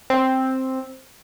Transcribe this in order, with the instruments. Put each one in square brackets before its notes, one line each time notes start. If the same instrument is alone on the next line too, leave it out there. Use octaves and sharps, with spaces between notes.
[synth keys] C4